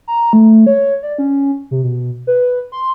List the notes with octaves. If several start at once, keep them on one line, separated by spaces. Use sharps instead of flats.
A#5
A3
C#5
D5
C#4
C3
B2
B4
C6